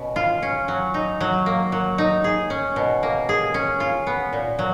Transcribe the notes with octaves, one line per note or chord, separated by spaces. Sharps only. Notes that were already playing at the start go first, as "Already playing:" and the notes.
Already playing: B2 C#4
F4
C#4
F#3
D#4
F#3
A#3
F#3
D#4
G#4
C#4
B2
A#3
G#4
C#4
F4
B3
A#2
F#3